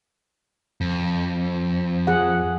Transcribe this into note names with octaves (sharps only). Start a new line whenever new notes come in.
F2
F3 G#4 F#5